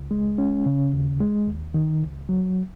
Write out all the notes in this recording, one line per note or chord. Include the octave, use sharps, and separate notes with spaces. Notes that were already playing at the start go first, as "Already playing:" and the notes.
Already playing: C#2
G#3
C#4
C#3
D#2
G#3
D#2
D#3
C#2
F#3